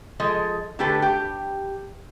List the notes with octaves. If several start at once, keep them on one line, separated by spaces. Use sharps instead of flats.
F3 G#3 A4 D#5
D3 A3 G4 A4 B4
G4 G5